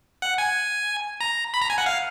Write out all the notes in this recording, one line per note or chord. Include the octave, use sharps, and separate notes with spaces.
F#5
G#5
A#5
B5
A#5
G#5
F#5
F5